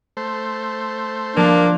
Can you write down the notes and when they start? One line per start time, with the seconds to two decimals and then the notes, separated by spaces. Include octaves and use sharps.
0.17 A3 C5
1.37 F3 A#3 D4